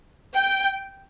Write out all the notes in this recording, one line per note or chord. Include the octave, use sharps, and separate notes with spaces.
G5